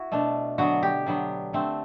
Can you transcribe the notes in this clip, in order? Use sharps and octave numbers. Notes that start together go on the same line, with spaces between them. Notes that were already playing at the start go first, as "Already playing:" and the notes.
Already playing: E4 F#4
B2 A3 D4
D3 F#3 B3 F#4
G4
D3 F#3 B3
D3 A3 C4